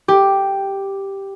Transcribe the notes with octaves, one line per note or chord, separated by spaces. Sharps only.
G4